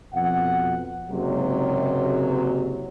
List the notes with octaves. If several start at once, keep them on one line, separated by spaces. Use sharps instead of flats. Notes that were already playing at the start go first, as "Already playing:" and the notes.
F2 B2 F#5
F#1 G#2 C3 F#3